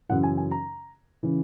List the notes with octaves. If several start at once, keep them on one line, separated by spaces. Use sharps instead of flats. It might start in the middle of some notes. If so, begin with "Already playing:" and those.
F#2 C#3 E3 F#5
G#5
G#5
A#5
C#3 E3